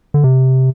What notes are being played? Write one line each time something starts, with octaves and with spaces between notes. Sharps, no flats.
D3
C3